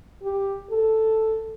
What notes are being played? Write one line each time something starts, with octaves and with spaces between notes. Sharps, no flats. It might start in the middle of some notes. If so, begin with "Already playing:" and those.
G4
A4